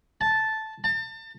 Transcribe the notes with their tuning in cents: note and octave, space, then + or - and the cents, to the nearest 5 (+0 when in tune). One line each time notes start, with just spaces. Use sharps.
A5 -5
A5 +35